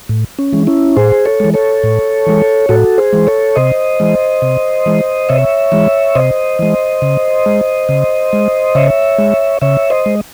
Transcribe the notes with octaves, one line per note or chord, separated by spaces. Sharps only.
A2
C#4
E3 G#3
C#4 E4
A2 G#4 C5
A4 C#5
E3 G#3
A4 C#5
A2
E3 G#3
A2 F#4 A4
G#4 C5
E3 G#3
A4 C#5
C3 C5 D#5
E3 G#3
C3
E3 G#3
C3 C#5 E5
E3 G#3
C3 C5 D#5
E3 G#3
C#3
G#3
C#3
G#3
C#3 C#5 E5
G#3
C#3 C#5 E5
C5 D#5
G#3